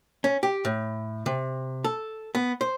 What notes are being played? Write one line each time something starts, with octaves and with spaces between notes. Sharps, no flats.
C#4
G4
A2
C3
A4
B3
C5